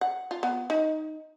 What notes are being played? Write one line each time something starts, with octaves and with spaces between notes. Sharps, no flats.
F#5
F4
B3
D#4